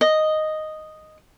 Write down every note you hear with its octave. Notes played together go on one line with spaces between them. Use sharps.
D#5